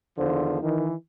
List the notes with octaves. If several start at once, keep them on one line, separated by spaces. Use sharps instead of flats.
E2 D3 D#3 F3 C5
D#3 E3